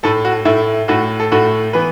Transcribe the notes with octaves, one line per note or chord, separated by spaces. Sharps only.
A2 A3 A4
F#4
A2 A3 E4
A2 A3 F#4
A4
A2 A3 F#4
E3 B3 B4